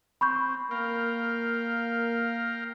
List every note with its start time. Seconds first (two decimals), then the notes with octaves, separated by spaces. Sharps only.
0.21 C4 B5 C#6 G6
0.71 A#3 A#4 F5 G5